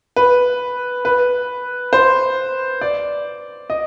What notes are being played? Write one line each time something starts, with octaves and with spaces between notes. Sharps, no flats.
B4
B4
C5
D5
D#5